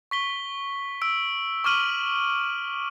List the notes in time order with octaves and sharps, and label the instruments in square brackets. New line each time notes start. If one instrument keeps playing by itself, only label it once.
[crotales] C#6 B6 G7
E6 D7
C#6 D6 E6 F6 D#7 F#7